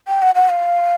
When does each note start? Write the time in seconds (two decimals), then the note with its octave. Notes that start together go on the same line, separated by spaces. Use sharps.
0.08 G5
0.22 F#5
0.35 F#5
0.49 F5